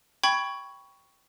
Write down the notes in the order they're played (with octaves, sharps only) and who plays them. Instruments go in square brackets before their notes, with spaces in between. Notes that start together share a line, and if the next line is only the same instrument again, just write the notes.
[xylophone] G5 B5 C#6 G#6